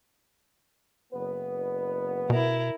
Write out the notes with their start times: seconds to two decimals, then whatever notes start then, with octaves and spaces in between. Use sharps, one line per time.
1.13 F#1 B3 B4
2.30 B2 E4 A#4